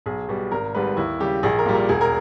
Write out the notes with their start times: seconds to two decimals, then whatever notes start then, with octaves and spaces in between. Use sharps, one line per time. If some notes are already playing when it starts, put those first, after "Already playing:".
0.06 B1 G#4
0.29 B2 G3
0.51 G#1 A#4
0.75 G#2 G3 B4
0.97 D#2 E4
1.20 C#3 G3 G4
1.43 A#1 G#4
1.59 A#4
1.66 A#2 G3
1.74 A#4
1.89 E1 G#4
2.01 A#4